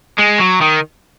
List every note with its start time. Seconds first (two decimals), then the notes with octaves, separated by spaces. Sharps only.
0.18 G#3
0.39 F#3
0.61 D#3